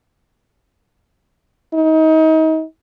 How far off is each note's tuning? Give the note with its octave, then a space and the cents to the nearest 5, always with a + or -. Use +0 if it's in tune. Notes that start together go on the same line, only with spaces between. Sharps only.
D#4 +30